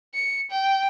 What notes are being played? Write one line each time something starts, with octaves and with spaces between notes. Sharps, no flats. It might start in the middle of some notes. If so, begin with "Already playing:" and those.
C#7
G5